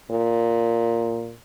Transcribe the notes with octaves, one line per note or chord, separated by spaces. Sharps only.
A#2